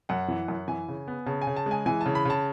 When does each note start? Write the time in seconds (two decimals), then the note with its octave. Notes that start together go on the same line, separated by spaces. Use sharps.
0.09 F#2 F#5
0.28 E3
0.48 F#2
0.68 E3 G#5
0.88 C#3
1.07 B3
1.26 C#3 A5
1.42 G#5
1.47 C#3
1.56 A5
1.66 G#3 G#5
1.86 E3 G#5
2.01 C#3 A5
2.15 B5
2.25 C#3 A5